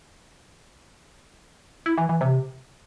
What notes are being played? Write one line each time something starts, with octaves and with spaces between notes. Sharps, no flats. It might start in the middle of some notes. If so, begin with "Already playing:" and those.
E4
E3
E3
C3